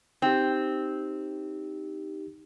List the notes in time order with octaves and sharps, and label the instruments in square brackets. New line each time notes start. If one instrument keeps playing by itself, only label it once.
[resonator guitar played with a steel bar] C4 [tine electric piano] D#4 G4